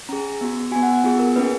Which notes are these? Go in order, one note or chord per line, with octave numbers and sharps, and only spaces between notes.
C#4 G#4 A#5
B3 F#4
B3 F#4 G#5
F#5
F#5
B3 F4 G#4
A#4
A#3 C#4 G#4 B4